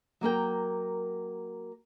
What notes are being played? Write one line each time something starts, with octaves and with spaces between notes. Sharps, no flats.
F#3 A#3 A#4 G5